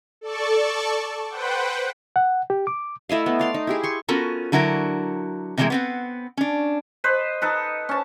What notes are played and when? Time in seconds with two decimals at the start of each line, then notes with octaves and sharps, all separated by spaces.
0.21 A4 D5 A5 C#6
1.28 B4 C5 F#5 G5
2.16 F#5
2.50 G4
2.67 D6
3.09 A3 E4 D#5 F5
3.26 B3
3.39 D5 F5 C6
3.54 D#4
3.67 E4 G4 G#4
3.83 C6 C#6
4.08 B3 C#4 F4 F#4 A4 A#4
4.52 D3 F#3 E4 F#4 A#4
5.57 C3 D#3 E3 G3 G#3 A#3
5.70 B3 C4 F#5
6.37 C#4 D4
7.04 B4 C5 D#5
7.42 D#4 A4 B4
7.89 C#4 A5